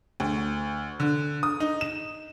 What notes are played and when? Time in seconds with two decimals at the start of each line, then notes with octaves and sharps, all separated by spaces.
0.20 D2
1.00 D3
1.43 D#6
1.60 D#4
1.81 E7